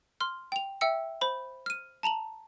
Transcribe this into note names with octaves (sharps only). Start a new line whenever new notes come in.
C6 F6
G5 F7
E5 G5 E6 C#7
C5 B5
F6 D#7
A5 A#5 F7 F#7